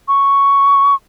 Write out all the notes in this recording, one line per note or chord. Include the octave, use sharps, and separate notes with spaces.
C#6